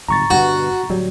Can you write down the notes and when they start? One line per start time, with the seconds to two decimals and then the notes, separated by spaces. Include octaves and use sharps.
0.09 D1 G1 A#5 C#6 A6
0.30 G1 G2 B2 F#4
0.90 D1 F#3 G3